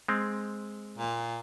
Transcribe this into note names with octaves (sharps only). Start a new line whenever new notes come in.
G#3 C4
A#2